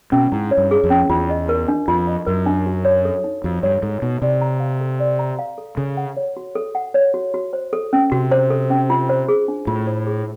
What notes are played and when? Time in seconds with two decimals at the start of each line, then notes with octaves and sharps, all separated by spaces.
0.12 B2 C#4
0.32 G#2 E4
0.51 C#5
0.58 G2
0.71 G#4
0.84 F2
0.90 C#4
1.09 E2 F4
1.29 D#5
1.49 A#4
1.68 D4
1.88 F2 F4
2.07 D#5
2.27 F#2 A#4
2.46 D4
2.66 F#4
2.85 C#5
3.05 A4
3.24 D#4
3.44 F2 F#4
3.63 G2 C#5
3.83 G#2 A4
4.02 B2 D#4
4.22 C3 D5
4.41 A#5
4.60 F5
4.80 A4
5.00 D5
5.19 A#5
5.39 F5
5.58 A4
5.77 C#3 A4
5.97 F#5
6.17 C#5
6.37 F#4
6.55 A4
6.75 F#5
6.94 C#5
7.14 F#4
7.34 F#4
7.53 C5
7.73 A4
7.93 C#4
8.12 C3 F#4
8.31 C5
8.50 A4
8.70 C#4
8.90 F4
9.09 C5
9.29 G#4
9.48 D4
9.67 A2 F4
9.87 C5
10.07 G#4